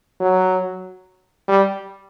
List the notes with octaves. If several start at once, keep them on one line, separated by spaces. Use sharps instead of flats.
F#3
G3